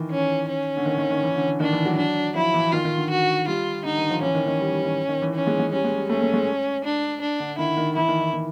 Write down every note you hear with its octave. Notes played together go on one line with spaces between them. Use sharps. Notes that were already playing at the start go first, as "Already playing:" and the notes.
Already playing: D#3 E3
C#4
C#4
D3
D#3
D#3
D#3
E3
D3
D3
D#3 D4
E3
F#3
D4
F3 E4
E3
D#3 F4
D#3
D3
F#4
G3 F4
D3 D#4
D#3
F3
E3 C#4
D#3
D#3
G3
G3
D#3
D#3
E3
C#4
G#3
G#3
G3 C#4
G#3
G3
A3 C#4
A3
G#3
D4
D4
D3
D#3 E4
D#3
E3 E4
D#3
D#3
D#3